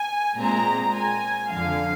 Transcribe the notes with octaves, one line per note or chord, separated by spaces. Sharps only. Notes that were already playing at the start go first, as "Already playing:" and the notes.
Already playing: G#5
A#2 G#3 C4 A#5
G#5
F2 D3 F3 F5